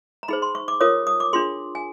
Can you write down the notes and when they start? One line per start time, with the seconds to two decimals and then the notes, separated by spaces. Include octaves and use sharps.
0.23 A#5
0.28 D#4 G#4 C5 B5
0.42 C6
0.55 C#6
0.68 D6
0.80 F4 A#4 C#5 D#6
1.07 D#6
1.20 D6
1.33 D4 F4 G#4 C6
1.75 G#5